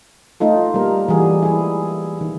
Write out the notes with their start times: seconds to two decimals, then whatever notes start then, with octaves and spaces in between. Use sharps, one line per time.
0.40 A3 D#4 F4 A4
0.74 G3 A#3 A#4
1.09 E3 G3 F#4 G#4
1.43 E4 G#4
2.21 D#3